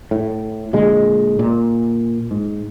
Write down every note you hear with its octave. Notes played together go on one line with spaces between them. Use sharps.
A2
A#2 D3 G#3
A#2
G#2